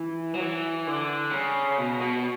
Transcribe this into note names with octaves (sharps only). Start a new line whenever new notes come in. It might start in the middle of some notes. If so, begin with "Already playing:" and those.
Already playing: E3
F#3
E3
D3
C#3
B2
B2